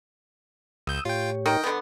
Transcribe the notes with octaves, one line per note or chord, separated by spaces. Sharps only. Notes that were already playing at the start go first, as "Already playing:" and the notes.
C#2 D#6 E6 G6
A2 F4 G4 C#5 G5
D#3 D#5 G5
D3 B3